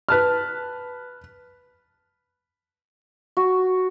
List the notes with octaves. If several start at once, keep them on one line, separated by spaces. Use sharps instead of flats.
B4 A5 F6
F#4